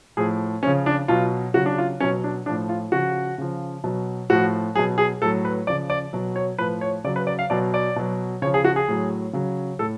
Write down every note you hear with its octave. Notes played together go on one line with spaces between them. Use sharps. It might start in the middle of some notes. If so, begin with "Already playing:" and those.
A2 F3 G#4
C#3 F3 C#4
D4
B2 F#3 F4
C#3 F#3 F#4
D4
F4
B2 F#3 C#4
D4
A2 F3 D4
F4
C#3 F3 F#4
C#3 F3
B2 F#3
A2 F3 F#4
B2 F#3 G#4
G#4
A2 F#3 A4
B4
C#3 F3 D5
D5
B2 F#3
C#5
A2 F3 B4
C#5
C#3 F#3 D5
B4
D5
F5
B2 F#3 D5
D5
B2 F#3
C#3 F3 C#5
G#4
F#4
G#4
A2 F#3
C#3 F#3
A2 A4